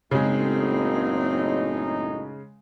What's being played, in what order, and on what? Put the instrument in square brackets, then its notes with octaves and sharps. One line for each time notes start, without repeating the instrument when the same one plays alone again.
[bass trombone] F#1 [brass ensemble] F#2 A2 D#4 [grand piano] C#3 G#3 [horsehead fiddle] C4